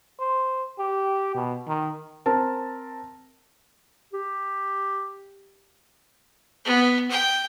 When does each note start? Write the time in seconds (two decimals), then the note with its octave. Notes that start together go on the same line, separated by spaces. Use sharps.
0.20 C5
0.79 G4
1.35 B2
1.67 D#3
2.26 C4 A#4 A5
4.13 G4
6.65 B3
7.10 G5